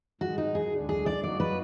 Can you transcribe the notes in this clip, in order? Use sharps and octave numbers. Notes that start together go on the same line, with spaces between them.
G#2 D#3 G#3 F#4
D#4
G#4
D2 D3 G#3 D4
G#4
D5
F#3 A#3 D#4 F#4 D5
B4